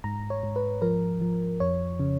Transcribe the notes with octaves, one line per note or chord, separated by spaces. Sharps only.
G#2 A#5
C#5
G#2
B4
F3 A#4
F3
F2 C#5
C#3